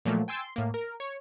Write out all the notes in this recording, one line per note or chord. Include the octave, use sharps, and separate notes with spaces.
A#2 F3 F#3 A3 A#3
G5 G#5 C6 E6 A6 D7
C6
A2 A#3
A#4
C#5